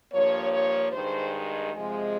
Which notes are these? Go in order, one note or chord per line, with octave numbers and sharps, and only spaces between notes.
G2 F3 A#3 C#5
C#5
G2 D#3 G#3 C5
C3 F3 G#3